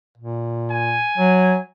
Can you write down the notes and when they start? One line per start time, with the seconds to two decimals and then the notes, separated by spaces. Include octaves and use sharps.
0.18 A#2
0.71 G#5
1.18 F#3